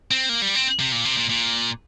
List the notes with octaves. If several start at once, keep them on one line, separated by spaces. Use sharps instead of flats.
C4
A#3
G3
C4
C3
A#2
C3
A#2
A#2